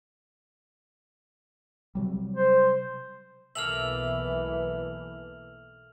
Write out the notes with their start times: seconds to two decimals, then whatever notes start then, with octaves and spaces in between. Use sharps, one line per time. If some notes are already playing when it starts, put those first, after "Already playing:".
1.95 C3 F#3 G3
2.36 C5
3.55 B1 E3 A#3 A4 E5 F6 F7 F#7